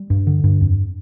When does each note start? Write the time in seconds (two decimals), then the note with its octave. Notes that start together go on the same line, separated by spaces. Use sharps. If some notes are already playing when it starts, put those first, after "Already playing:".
Already playing: G3
0.10 G2
0.27 D3
0.44 G2
0.61 F2